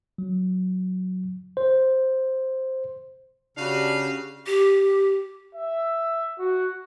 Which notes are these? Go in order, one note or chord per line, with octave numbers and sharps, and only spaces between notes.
F#3
C5
C#3 D4 F#4 G4 B4 F5
G4
E5
F#4